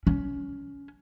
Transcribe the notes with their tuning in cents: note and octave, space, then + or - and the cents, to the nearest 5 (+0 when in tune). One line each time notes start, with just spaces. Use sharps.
C#4 +20